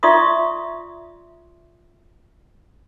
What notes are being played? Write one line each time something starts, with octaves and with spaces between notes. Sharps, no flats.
F4 D5 E5 C6 C#6 D#6